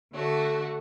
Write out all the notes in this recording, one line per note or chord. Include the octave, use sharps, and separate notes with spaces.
D3 A3 F#4